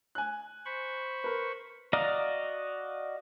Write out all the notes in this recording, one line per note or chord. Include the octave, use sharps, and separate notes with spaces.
G#5 F#6
C5 B5 C#6
A#4 B4
F#4 D5 D#5 F5 A#5